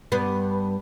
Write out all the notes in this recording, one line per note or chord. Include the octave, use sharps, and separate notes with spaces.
G2 B3